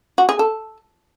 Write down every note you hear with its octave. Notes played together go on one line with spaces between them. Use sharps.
F#4
G#4
A4